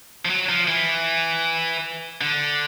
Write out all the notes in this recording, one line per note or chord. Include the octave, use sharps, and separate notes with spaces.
F3
F#3
F3
E3
D3